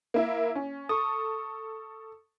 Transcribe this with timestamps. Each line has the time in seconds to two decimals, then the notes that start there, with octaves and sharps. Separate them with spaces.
0.14 A#3 E4
0.55 C#4
0.89 A4 C#6 D#6